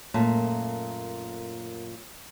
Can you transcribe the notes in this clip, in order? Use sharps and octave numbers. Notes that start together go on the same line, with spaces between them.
F#2 A#2 A3 A5